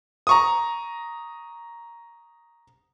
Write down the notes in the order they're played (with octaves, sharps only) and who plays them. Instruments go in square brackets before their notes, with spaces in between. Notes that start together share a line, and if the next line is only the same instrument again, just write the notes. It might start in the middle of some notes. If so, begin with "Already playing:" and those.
[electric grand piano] A#5 C#6 D#6